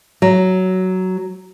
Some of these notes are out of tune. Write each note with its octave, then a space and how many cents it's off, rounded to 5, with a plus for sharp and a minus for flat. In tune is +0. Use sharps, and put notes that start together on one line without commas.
F#3 +10